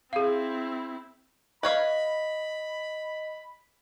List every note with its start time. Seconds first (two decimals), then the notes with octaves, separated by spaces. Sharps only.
0.13 C4 E4 G#4 F5
1.63 B4 C#5 D#5 F5 B5